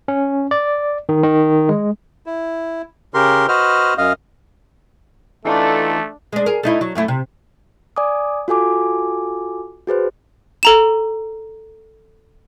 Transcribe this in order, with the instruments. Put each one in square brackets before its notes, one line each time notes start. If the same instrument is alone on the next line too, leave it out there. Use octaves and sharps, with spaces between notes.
[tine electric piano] C#4
D5
D#3
D#3
G#3
[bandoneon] E4
C#3 G4 A#4 C6
F#4 B4 C5 D#5 F6
F#2 D#5 F5
[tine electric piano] E3 D#4 F4 [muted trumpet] A3 [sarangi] D4 [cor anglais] A4
[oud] G#3 D4
G#4 A#4
A3 D#4 E4
F#3
F#2 A3 E4
C3
[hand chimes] D5 G#5 D6 D#6
F4 F#4 A4 G#5 D6
F#4 G#4 B4 C5
[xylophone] A4 A#5 E7